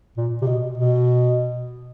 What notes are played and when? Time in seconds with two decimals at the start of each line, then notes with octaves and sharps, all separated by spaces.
0.17 A#2
0.42 C3
0.47 B2
0.77 B2